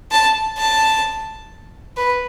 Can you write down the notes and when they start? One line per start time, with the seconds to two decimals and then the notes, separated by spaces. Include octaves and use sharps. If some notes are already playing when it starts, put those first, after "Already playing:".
0.11 A5
0.58 A5
1.97 B4